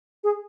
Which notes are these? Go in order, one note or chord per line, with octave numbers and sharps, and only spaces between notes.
G#4